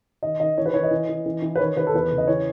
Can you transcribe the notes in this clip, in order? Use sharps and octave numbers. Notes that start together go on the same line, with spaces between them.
D#3 D#5
D#3 D#5
E3 C#5
B4
E3 C#5
D#5
E3
E3
E3
E3
B4
D#3 C#5
D#3 B4
A4
E2 B4
C#3
D#5
E3 C#5